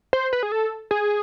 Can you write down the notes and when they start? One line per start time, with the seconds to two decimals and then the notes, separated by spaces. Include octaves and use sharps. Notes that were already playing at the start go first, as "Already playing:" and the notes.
0.13 C5
0.33 B4
0.43 G#4
0.52 A4
0.91 G#4